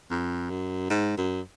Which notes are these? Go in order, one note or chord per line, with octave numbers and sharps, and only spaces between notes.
F2
F#2
G#2
F#2